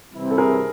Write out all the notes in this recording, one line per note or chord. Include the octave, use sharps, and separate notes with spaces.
C3 E3 G3 C4 E4
A4
G#4 A#4